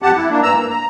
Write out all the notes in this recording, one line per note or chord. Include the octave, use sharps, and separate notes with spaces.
F2 G4 F#5 A5
E4
A#3 D4
G2 E3 A#5 E6
A#3
A#5